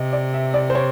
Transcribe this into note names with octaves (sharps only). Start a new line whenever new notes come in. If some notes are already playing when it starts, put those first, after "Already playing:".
Already playing: C3 D#5
D5
E5
D5
C5
C#5